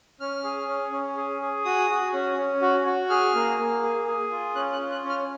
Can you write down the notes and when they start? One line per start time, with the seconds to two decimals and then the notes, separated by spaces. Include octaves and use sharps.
0.20 C#4 F6
0.44 G#4
0.68 C#4
0.92 C#4
1.17 G#4
1.42 G#4
1.65 F#4 D#6
1.90 F#4
2.13 C#4
2.37 C#4
2.62 F#4
2.85 F#4
3.10 G#4 F6
3.35 A#3
3.58 A#3
3.83 G#4
4.07 G#4
4.31 F4
4.55 C#4 F#6
4.73 F#6
4.79 F4
4.92 F#6
5.04 C#4
5.09 F6